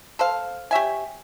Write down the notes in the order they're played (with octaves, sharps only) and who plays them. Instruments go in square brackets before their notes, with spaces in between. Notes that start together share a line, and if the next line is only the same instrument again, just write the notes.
[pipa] A4 C5 F5
G4 C#5 E5 G#5